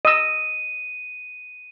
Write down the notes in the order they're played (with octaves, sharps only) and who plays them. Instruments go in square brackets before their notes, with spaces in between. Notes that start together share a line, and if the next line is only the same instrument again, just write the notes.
[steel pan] D#5 E6 [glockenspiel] D#7